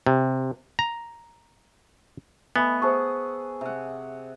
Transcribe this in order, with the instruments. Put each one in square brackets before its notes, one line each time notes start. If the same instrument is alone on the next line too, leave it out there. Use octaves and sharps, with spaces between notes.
[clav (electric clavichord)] C3
A#5
[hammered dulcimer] A3 D#5 C#6 [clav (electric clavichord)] B3 [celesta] G#5 B5
[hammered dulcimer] G#4 E5 F#5 [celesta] C5 A5 C#6
[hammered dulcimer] C3 F#5